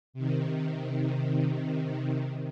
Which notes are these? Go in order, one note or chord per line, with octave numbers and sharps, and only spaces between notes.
C3 D#3